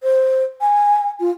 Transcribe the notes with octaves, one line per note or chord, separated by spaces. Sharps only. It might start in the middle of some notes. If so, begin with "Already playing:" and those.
C5
G#5
F4